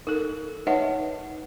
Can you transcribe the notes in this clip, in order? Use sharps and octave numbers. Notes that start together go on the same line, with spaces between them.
D#4 A4 A#4
D#4 B4 C#5 D#5 E5 F#5